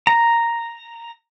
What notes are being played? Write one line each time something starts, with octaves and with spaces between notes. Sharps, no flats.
A#5